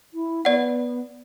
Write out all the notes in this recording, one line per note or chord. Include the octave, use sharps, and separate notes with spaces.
E4
B3 D5 F#5